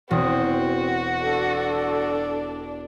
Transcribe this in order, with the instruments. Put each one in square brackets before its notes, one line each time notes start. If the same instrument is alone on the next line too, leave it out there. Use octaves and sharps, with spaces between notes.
[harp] E1 D#6 [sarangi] C4 [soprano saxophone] F#4
[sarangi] D4 [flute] A4